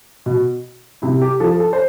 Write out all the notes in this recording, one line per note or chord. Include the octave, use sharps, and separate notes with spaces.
B2
C3 E4
G4
F3 A4
A4
C5